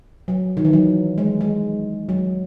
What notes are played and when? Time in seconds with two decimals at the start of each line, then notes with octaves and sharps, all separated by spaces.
0.28 F#3
0.57 D#3
0.65 E3
0.73 F#3
1.18 G#3
1.41 G#3
2.09 F#3